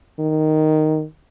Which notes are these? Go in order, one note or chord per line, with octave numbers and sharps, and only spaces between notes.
D#3